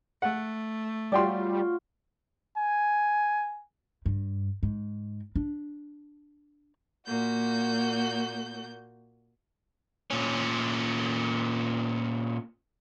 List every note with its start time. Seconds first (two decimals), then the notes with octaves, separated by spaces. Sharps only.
0.22 A3 F#5
1.12 G3 F4 F#4 C#5 D5 G5 C6
2.57 G#5
4.06 G2
4.63 G#2
5.35 D4
7.06 A#2 A#3 F#4 G6
10.10 A#2 C#4